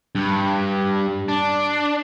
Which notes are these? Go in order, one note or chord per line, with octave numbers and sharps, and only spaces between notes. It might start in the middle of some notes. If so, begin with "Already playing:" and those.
G2
D4